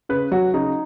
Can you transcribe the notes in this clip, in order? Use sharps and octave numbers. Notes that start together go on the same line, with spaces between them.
C#3 B4
F#3 F#4
C#3 D#4